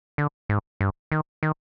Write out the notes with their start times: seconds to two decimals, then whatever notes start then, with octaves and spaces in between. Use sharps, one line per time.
0.18 D3
0.49 G#2
0.81 G2
1.12 D#3
1.43 D#3